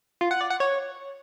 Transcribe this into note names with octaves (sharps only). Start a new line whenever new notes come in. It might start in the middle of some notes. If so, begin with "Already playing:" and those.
F4
F#5
D5
F#5
C#5